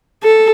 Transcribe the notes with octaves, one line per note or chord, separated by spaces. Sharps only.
A4